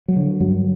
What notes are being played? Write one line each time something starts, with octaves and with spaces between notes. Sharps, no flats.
F#3
D3
G2 F#3